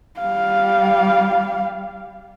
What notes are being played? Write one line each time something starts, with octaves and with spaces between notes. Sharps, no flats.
G3 F5